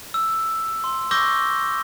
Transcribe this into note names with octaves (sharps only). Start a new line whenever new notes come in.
E6
C6
C#6 D6 E6 G6 A#6 G7